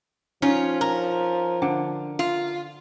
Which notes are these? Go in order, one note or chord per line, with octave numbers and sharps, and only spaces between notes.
F3 C#4 D#4 F4
A#4
D3
F4